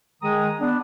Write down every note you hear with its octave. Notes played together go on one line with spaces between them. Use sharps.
D#3 G#3 A#5 D#6
B3 D4